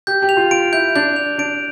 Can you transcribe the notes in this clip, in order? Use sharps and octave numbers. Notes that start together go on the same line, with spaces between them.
G4 G6
G4
F7
F4
F4 D7
E4 G6
D4 G6
F7
D4 D7